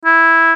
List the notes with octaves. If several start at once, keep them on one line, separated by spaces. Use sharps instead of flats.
E4